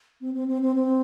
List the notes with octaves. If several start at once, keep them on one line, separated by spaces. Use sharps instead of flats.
C4
C4
C4
C4
C4